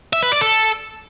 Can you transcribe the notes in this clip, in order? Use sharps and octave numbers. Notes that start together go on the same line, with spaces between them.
E5
B4
D5
A4